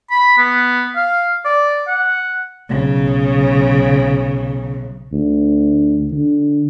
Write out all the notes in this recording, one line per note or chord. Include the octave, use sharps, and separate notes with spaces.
B5
B3
F5
D5
F#5
B1 C#3
D2
D3